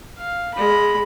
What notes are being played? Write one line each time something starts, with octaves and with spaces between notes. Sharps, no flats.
F5
G#3 B5